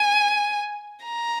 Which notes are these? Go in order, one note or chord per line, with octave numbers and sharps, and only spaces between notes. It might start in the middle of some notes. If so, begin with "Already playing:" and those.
Already playing: G#5
A#5